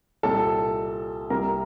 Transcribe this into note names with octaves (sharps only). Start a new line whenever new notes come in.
C2 A#2 G3 C4 D#4 A4 A5
C2 C3 G3 A#3 A#4 A#5